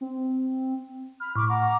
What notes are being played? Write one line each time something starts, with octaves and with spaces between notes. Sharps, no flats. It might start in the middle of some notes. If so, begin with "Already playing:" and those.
C4
B5 F6
A2 B5 C#6 D6
F#5 A#5 D6